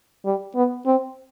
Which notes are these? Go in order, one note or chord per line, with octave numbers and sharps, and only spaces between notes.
G3
B3
C4